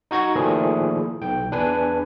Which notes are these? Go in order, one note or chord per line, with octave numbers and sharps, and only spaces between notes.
D#4 F#4 G#6 A#6
A#2 D#3 F3 A3 E4 G#4
B1 G5
E2 D4 B4 G#5